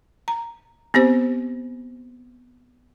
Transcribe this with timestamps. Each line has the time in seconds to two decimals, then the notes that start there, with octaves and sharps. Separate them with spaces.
0.28 A#5
0.94 B3 C4 G4 C5